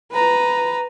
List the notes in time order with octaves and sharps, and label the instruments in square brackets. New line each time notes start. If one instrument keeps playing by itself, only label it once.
[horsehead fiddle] B4 A#5